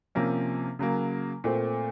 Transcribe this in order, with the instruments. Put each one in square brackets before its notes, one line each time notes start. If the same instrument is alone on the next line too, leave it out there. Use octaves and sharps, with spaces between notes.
[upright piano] C3 F3 A#3 C#4
C#3 F#3 A#3
A#2 A3 C4